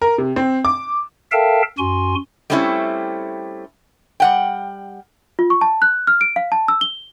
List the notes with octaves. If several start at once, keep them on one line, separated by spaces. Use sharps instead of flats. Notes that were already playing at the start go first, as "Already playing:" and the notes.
A#4
C3
C4
D6
A4 A#4 E5 F5 G5 A5
F#2 F#4 G#5 C6
G3 A3 C4 C#4 D#4 E4
G3 F#5 G5
F4
C#6
A5
F#6
F6
D7
F5
A5
E6
G7